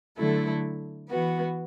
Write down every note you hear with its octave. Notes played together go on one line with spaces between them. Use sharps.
D3 F#3 A3 E4 A4
E3 B3 F#4 B4